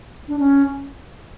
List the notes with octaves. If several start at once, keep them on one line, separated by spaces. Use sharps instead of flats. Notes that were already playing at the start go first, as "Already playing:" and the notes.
D4
C#4